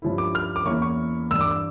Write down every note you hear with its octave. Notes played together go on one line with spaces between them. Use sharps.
G2 F3 C#4 E4
D6
F6
D6
E2 E3 A#3 C#4 E4 C#6
C#6
G2 E3 G3 D4 E6
D6
E6